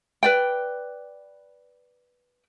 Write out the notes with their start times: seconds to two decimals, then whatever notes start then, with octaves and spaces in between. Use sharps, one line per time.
0.23 B4 D5 G5